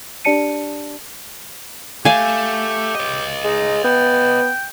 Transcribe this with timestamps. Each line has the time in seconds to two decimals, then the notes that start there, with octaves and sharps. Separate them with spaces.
0.25 D4 G4 D5 A5 C#7 D#7
2.05 A3 G4 F5 G#5
2.95 C#5 D#5
3.45 G#3 D#4
3.84 B3 G5